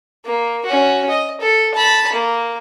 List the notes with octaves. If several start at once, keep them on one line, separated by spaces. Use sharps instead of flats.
A#3
C#4 F#4
D#5
A4
A5 B5
A#3